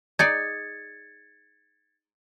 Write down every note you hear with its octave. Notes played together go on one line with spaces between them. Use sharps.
D#4 G#4 D5 G#6 A6 C#7